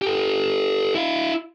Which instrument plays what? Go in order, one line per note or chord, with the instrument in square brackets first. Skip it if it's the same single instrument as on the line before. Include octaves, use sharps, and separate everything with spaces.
[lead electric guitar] G4 A4
E4 F5